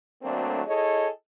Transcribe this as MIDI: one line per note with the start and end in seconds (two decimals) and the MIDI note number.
0.23 0.61 38
0.23 0.61 54
0.23 0.61 57
0.23 0.61 58
0.23 0.61 60
0.23 0.61 62
0.66 1.08 64
0.66 1.08 68
0.66 1.08 69
0.66 1.08 73
0.66 1.08 75